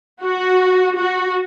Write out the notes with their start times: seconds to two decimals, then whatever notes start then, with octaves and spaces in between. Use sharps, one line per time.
0.22 F#4
0.96 F#4